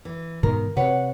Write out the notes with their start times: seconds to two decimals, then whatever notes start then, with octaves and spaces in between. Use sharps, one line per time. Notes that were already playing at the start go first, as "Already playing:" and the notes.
0.05 E3
0.43 G#2 B2 D#3 A#4
0.77 C3 B4 C#5 F#5